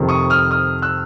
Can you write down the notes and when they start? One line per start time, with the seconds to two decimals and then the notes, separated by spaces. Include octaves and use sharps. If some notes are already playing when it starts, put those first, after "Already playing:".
Already playing: F2 C3 D#3
0.09 C#6 D#6
0.30 D#6 F6
0.51 D#6 F6
0.82 E6 F#6